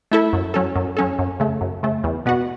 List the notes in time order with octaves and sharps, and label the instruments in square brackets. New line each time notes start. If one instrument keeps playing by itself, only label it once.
[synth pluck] A3 E4 A4
F#2
F#3 C#4 A4
F#2
F#3 C#4 A4
F#2
C#3 A3
F#2
C#3 A3
E2
B2 B3 F#4